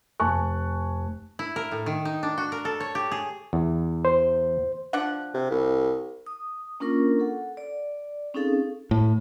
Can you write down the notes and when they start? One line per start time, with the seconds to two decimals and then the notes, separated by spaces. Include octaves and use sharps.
0.20 F1 G#5 A5 C#6 F#6
1.39 E4
1.56 A#4
1.72 A2
1.86 D#3
2.05 D#4
2.23 D4
2.38 F#4
2.52 A#4
2.65 A4
2.80 C#5
2.95 G4
3.12 G#4
3.53 E2
4.05 C5
4.93 F3 D4 F#5
5.35 C3
5.51 C2
6.26 D#6
6.80 A#3 C#4 D4 F4 A#4 C#6
7.20 A4 F#5
7.57 D5
8.34 C4 C#4 D#4 G#4 A4 F5
8.91 A2